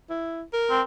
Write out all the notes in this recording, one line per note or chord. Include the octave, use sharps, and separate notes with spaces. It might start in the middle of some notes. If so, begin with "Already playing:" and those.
E4
A#4
C4